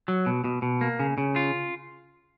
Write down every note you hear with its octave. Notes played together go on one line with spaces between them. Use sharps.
F#3
B2
B2
B2
A#3
C#3
C#3
F4